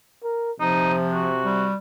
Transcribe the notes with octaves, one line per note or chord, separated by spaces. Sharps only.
A#4
C3 F3 D#4
F#4
G3